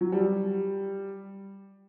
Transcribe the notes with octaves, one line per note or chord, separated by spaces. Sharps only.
F#3
G3